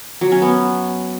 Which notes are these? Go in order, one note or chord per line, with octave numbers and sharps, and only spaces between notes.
F#3
C#4
B3